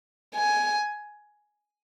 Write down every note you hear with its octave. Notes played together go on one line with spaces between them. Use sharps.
G#5